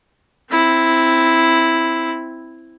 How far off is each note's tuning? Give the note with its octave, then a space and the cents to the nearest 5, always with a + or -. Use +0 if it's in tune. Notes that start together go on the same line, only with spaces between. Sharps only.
C4 +0 E4 +0